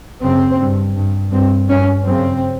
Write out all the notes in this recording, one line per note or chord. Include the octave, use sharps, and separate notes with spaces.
F#2 C#3 C4
G2
G2
G2 C4
G2 C#4
F#2 C#3 C4